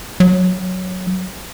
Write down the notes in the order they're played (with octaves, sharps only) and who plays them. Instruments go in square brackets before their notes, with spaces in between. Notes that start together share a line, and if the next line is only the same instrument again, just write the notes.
[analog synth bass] F#3